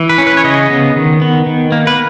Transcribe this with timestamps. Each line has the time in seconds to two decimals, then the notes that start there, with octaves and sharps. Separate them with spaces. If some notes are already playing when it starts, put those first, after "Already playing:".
Already playing: E3
0.09 B4
0.18 C#4
0.27 B4
0.37 C#5
0.44 C#3 D#5
0.70 B3
0.96 D#3
1.22 B3
1.46 D#3
1.72 A#3
1.87 B4